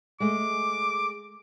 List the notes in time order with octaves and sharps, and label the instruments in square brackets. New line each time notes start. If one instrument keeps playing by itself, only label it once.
[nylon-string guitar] G#3 A3 [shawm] D6